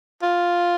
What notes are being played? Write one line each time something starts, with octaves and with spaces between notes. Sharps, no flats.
F4